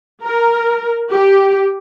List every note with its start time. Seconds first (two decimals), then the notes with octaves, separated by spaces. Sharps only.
0.24 A#4
1.11 G4